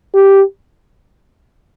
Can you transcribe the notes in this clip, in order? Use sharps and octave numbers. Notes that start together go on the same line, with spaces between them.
G4